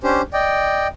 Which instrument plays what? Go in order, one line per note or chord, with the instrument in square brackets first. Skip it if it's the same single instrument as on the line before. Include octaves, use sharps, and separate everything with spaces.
[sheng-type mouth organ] C#4 D4 G4 C5
D5 D#5 G5